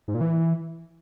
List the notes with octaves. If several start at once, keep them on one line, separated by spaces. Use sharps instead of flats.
G#2
A#2
E3